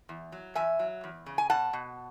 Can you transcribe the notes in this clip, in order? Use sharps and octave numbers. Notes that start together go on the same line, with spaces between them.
E2
F#3
E2 E5 G#5
F#3
E2
C#3
G#5
B2 F#5 A5
B2